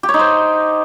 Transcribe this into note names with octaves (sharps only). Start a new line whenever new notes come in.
G4
C#5
D#4
C5